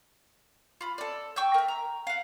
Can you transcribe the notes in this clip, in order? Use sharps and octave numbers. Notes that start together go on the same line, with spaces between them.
F4 B5
A4 D5
G5 C#6 E6 G6
A#4 E5
A#5
F5 F#5